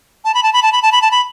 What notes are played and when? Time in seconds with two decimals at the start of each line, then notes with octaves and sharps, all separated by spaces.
0.25 A5
0.34 B5
0.43 A5
0.53 B5
0.63 A5
0.72 B5
0.82 A5
0.92 B5
1.02 A5
1.11 B5